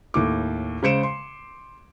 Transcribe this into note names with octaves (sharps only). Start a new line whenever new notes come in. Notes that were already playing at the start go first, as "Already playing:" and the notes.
D#2 A2 D6
C#3 G#3 C5 C#7 D7 E7
C6